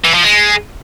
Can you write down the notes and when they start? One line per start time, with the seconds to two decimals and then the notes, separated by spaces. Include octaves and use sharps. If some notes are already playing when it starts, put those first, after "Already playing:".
0.05 E3
0.14 F3
0.24 G#3